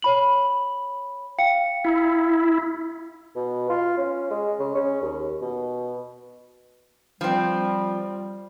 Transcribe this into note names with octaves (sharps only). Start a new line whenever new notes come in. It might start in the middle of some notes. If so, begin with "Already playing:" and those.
C#5 B5 F#7
F5 G5 C#7
E4
B2
F4
C#4
G#3
C#3
C#4
D#2
B2
F3 G3 C4